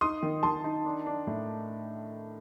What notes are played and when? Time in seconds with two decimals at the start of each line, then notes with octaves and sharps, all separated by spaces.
0.01 D#4 C6 D#6
0.23 D#3
0.43 D#3 A5 C6
0.64 D#4
0.85 D4
1.06 D4
1.27 A2